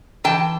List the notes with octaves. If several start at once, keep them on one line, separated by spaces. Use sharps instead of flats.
E3 G5 A5